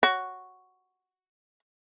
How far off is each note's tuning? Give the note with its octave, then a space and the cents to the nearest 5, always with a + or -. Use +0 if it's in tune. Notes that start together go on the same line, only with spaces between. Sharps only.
F#4 +0 C#5 -5